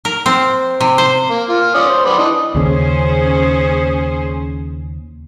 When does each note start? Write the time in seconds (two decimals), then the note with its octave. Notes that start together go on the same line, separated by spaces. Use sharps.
0.05 A#4
0.26 C4
0.81 C3
0.98 C5
1.30 A#3
1.49 F4 A#4
1.75 C#4 D5 D#6
1.89 C5
2.05 B3 D5 B5
2.18 E3 D4 D#5
2.55 D#2 C#3 C#4 G#4 C5